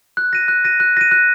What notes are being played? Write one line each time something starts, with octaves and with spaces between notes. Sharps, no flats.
F#6
A#6 D#7
F#6
A#6 D#7
F#6
A#6 D#7
F#6